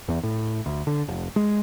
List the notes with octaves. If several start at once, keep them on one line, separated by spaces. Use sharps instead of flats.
E2
A2
D2
D3
F1
G#3